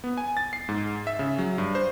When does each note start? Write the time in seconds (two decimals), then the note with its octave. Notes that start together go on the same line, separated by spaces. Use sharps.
0.04 B3
0.18 G#5
0.37 A6
0.53 C7
0.69 G#2
1.07 E5
1.19 C#3
1.38 F#3
1.58 G2
1.75 C5